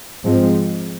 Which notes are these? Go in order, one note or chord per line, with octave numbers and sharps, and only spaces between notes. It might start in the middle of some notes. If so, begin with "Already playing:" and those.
G#2 F3 G#3 C4